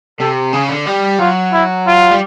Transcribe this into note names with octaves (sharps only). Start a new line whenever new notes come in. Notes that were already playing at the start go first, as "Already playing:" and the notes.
C3 A4
C#3 G#4
D3
G3
F#3 F4
E4
F4
G3